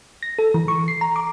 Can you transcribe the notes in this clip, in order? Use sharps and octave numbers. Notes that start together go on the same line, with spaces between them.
A#6
A4
E3
C#6
C7
A#5
D6